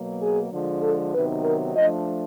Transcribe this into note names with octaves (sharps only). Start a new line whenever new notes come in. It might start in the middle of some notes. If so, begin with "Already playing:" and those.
Already playing: B2 F#3 A#3
G#4
D3 F3 G#3
A4
C3 D#3 F#3 B3 D#4 B4
A#4
F3 A3 D4 D#5